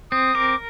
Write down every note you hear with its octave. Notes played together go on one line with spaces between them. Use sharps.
C4 D#6
A#4 D6